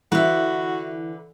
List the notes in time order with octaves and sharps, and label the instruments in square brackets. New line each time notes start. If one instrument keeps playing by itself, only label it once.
[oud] D3 [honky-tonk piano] E3 [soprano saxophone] F#4 [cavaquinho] B4 E5